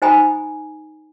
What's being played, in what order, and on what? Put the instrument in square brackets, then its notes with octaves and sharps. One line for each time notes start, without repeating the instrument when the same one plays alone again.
[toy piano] D#4 C5 G#5 A#5 B5 D#6